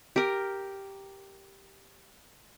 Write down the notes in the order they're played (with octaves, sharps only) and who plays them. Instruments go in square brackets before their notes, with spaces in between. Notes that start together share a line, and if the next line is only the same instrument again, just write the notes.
[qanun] G4 A#4